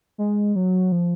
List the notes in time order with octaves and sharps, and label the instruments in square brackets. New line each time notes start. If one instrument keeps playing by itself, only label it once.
[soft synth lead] G#3
F#3
F3